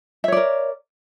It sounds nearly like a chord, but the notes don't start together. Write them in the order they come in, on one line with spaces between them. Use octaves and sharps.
E5 C#5 D5 A#4